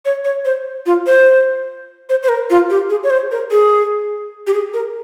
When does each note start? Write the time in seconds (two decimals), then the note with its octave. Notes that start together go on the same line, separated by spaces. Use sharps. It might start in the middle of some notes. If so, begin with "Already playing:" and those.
0.05 C#5
0.25 C#5
0.45 C5
0.86 F4
1.06 C5
2.09 C5
2.23 C5
2.29 A#4
2.50 F4
2.70 G4
2.90 G#4
3.04 C#5
3.10 C5
3.31 A#4
3.51 G#4
4.47 G4
4.54 G#4
4.74 A#4